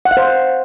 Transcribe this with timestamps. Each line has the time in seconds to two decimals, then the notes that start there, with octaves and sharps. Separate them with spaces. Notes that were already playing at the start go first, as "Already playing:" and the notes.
0.05 F#5
0.11 F5
0.17 C5